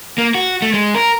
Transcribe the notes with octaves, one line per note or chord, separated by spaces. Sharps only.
A#3
F#4
A3
G#3
A#4